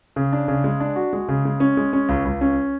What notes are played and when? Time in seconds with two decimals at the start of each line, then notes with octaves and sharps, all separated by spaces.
0.16 C#3
0.33 D4
0.48 C#3
0.64 G#3
0.80 D4
0.96 F#4
1.13 G#3
1.28 C#3
1.45 G#3
1.60 C#4
1.77 G#3
1.93 C#4
2.09 C#2
2.25 C#2
2.41 C#4